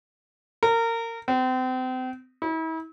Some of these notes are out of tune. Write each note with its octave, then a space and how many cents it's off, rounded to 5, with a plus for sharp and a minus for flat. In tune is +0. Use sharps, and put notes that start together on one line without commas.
A#4 -25
C4 -35
E4 -40